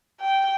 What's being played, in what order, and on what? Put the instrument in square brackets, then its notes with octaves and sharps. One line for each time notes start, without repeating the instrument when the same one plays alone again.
[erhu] G5